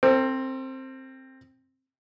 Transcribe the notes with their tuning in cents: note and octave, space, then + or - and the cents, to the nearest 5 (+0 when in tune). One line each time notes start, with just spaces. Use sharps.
C4 +10 A4 +45